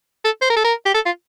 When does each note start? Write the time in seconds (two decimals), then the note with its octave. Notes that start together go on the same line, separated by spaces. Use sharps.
0.25 A4
0.42 C5
0.50 A#4
0.56 A4
0.64 A#4
0.86 G4
0.95 A4
1.06 F4